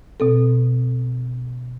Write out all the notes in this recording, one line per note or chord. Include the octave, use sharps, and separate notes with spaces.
B2 C4 A4